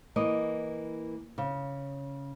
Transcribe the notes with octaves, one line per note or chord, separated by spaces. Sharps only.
E3 A#3 D#5
C#3